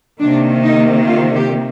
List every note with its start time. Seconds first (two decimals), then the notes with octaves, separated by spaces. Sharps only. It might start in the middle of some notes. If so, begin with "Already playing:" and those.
0.20 C3 D#3 A#3 D4
0.63 D#4
1.07 F4
1.36 G4